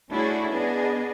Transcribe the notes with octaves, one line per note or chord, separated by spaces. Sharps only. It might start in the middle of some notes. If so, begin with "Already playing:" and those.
A3 C#4 D4 E4 F#4 G#4
B3 D4 G#4 D#5